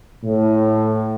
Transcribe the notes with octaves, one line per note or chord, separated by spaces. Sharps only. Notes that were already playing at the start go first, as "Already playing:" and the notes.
A2